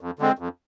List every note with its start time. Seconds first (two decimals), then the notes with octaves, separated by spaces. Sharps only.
0.01 F2
0.19 D3 G#3 C4
0.38 F2